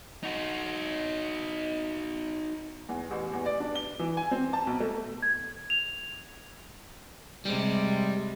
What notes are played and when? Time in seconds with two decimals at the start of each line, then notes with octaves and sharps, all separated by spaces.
0.23 D#4 F#4
2.89 E2
3.11 A1
3.33 E2
3.46 D5
3.60 D4
3.75 G7
3.99 E3
4.17 G#5
4.31 C4
4.53 A5
4.67 B1
4.80 A3
5.22 G#6
5.70 F7
7.45 C3 G3 G#3